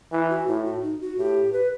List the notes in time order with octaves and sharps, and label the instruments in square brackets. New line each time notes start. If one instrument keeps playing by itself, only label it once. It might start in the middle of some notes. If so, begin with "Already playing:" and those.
[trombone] E3 [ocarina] E4
[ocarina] F#4
[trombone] A2 [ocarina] E4
[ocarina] F#4
D#4
F#4
[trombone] A2 [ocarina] G4
[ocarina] B4